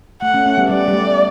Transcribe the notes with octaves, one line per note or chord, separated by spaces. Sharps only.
A3 F#5
A3 C#4
A3 C#4
G3 B3
G3 D5
G3
A3